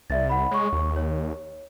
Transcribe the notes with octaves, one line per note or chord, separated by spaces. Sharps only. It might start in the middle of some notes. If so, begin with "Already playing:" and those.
C2 D5 E5 A6
F#5 B5
G#3 C#5 C#6
D#2
C#5